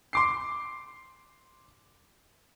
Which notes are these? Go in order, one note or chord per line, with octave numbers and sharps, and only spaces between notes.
C6 D6 C7